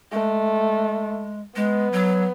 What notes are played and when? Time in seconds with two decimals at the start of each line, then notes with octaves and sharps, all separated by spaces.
0.12 G#3 A3
1.56 G#3 B3
1.92 F#3